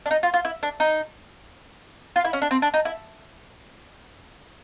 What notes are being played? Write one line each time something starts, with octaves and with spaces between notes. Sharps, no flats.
D4
D#4
F4
F4
E4
D4
D#4
F4
E4
C#4
D4
C4
D4
D#4
E4